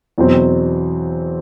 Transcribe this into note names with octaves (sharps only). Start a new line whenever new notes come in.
E2 B2 F#3 C4